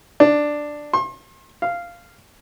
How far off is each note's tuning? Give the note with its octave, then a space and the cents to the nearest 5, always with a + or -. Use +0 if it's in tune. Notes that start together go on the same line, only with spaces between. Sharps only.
D4 +5
C6 +40
F5 -10